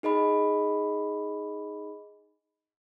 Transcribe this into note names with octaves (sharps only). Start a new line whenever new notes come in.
D#4 G#4 D#5 B5